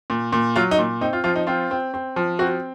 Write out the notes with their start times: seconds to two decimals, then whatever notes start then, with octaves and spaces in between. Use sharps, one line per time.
0.10 A#2
0.32 A#2
0.56 F#3 F4
0.71 D#4
0.79 A#2
1.01 C4 D#4
1.13 F4
1.24 F3 F4
1.36 D#4
1.47 C4 F4
1.71 C4
1.94 C4
2.16 F3
2.39 C4 F#4